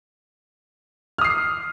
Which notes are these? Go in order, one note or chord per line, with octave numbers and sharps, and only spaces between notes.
D#6 F6 C7